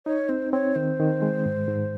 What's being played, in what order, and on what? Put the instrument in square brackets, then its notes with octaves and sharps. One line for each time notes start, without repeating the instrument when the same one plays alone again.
[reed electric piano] D#4 [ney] C#5
[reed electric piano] C4 [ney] C5
[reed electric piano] C4 [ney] C#5
[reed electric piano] D#3 [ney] C5
[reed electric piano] D#3
G#3
G#2
G#2